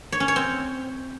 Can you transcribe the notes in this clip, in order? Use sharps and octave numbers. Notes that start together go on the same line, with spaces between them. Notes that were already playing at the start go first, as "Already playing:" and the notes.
C#5
C#4
C#5
C4